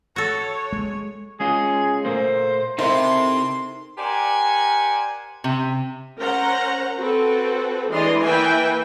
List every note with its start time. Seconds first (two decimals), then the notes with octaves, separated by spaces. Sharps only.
0.16 F#4 A4 C#5
0.73 G#3
1.40 G#3 C#4 F4 G#4
2.05 A#2 A3 A#3 C5
2.78 C3 D#4 E4 A4 A#4 C5 C6
3.98 G4 A#4 C5 D5 F#5 G#5
5.44 C3
6.19 C#4 A#4 C5 F#5 A#5
6.97 C4 F#4 A4 B4
7.90 E3 G#3 D4 D5 D#5 C6
8.23 E3 A#3 B4 E5 G5 G#5